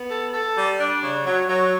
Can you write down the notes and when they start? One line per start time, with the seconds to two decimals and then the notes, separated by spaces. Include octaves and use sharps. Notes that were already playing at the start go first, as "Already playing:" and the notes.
Already playing: B3
0.11 A4
0.34 A4
0.56 G3
0.80 D4
1.03 C#3
1.26 F#3
1.49 F#3